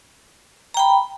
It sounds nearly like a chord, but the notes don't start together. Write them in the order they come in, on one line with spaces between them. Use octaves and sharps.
A#5 G5 B5